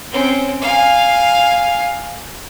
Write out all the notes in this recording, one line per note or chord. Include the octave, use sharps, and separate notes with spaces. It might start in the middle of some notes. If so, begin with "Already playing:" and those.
C4 C#4
F5 G#5